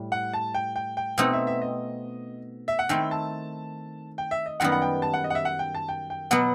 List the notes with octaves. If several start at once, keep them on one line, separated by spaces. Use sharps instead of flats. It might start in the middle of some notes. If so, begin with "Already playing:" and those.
Already playing: A2 G3
F#5
A5
G5
G5
G5
B2 A3 C4 D#4 F#5
E5
E5
D#5
E5
F#5
D#3 A3 C4 E4 G5
A5
G5
E5
D#5
F#2 D#3 G3 B3 F#5
F#5
G5
A5
F#5
D#5
F#5
E5
F#5
G5
A5
G5
G5
B2 F#3 B3 F#5